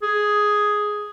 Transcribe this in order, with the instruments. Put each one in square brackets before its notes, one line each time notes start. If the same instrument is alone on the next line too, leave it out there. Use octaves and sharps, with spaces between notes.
[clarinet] G#4